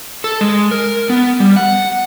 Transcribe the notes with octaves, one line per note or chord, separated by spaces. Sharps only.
A4
G#3
A#4
B3
G3
F#5